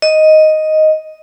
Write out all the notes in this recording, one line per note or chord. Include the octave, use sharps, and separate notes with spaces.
D#5